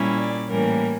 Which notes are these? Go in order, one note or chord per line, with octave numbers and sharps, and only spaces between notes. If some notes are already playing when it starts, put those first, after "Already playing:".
Already playing: A#2 G3 C#4 E4
D5
A2 E3 G3 A#3 C#4 A#4